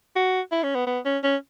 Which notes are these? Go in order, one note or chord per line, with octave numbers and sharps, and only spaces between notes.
F#4
E4
C#4
B3
B3
C#4
C#4